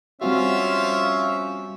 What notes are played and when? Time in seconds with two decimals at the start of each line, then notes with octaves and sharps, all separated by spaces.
0.21 F3 G3 C4 C#4 F4 F#4 E5